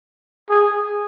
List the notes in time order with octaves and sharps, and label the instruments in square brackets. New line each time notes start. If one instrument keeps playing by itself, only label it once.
[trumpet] G#4